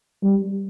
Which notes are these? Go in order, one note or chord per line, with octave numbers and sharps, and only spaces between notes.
G3